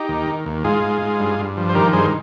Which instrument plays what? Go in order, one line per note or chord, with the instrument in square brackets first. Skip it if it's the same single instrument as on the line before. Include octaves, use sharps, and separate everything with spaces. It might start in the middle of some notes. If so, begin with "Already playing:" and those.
Already playing: [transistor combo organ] D#4 G4
D#2
D#3
D#2
G#2 F4 G#4
G#2
G#2
G2
G2
F3
C5
D#3 G4 A#4
G2 G#4 C5